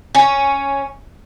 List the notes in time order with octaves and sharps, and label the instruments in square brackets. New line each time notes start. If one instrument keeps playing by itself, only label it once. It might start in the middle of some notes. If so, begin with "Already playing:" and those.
[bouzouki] C#4